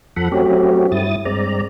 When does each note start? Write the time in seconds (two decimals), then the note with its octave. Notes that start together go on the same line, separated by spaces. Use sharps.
0.16 F2 F3 A4 F#5 B5
0.32 F#3 A3 C4 C#4 F#4 G4
0.92 G2 E4 D#6 A6
1.25 G2 G#3 C4 D5 A#5